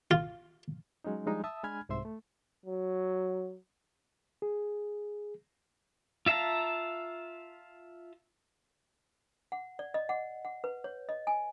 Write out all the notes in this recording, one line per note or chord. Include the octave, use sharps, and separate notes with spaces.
F4
F#3 G#3 C#4 D#4
F3 G3 G#3 D4 D#4
E5 A5 D#6 E6
G#3 D4 G#5 B5 F6 G#6
C2 G#2 C3 C5 E5 C6
A3
F#3
G#4
F4 E5 F5 A5 A#5
F#5
D5
D#5
F#5
F#5
B4
C#5
D#5
G#5